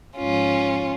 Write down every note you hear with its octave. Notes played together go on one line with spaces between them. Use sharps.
G#2 F3 C#4 F4